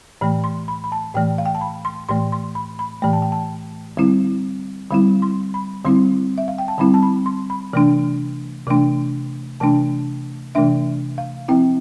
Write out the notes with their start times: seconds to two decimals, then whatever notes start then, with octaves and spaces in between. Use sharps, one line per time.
0.21 A2 E3 A3 B5
0.44 C6
0.68 B5
0.84 B5
0.92 A5
1.15 A2 E3 A3 G5
1.38 F5
1.46 G5
1.55 A5
1.61 B5
1.85 C6
2.09 A2 E3 A3 C6
2.32 C6
2.55 B5
2.79 B5
3.02 A2 E3 A3 B5
3.13 A5
3.22 G5
3.32 A5
3.97 D3 G3 C4 E4
4.90 D3 G3 C4 E4 B5
5.22 C6
5.54 B5
5.85 D3 G3 C4 E4 C6
6.38 E5
6.48 F5
6.58 G5
6.68 A5
6.78 D3 G3 C4 E4 B5
6.94 A5
7.03 B5
7.26 C6
7.50 B5
7.73 C3 E3 A3 D4
8.67 C3 E3 A3 D4
9.60 C3 E3 A3 D4 A5
10.55 C3 E3 A3 D4 E5
11.18 F5
11.48 F3 C4 E4 G5